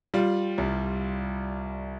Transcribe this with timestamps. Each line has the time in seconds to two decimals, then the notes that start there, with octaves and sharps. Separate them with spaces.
0.14 G3 F4
0.58 C2